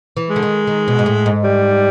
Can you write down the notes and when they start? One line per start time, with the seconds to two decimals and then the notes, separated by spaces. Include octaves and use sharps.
0.17 E3
0.30 G#3
0.36 D3
0.43 D#3
0.67 D#3
0.88 B2
0.99 G#2
1.06 A2
1.26 G#2
1.44 G3